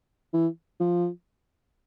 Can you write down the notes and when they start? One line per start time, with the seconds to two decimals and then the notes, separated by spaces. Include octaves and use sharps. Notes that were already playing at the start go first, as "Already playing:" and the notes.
0.33 E3
0.80 F3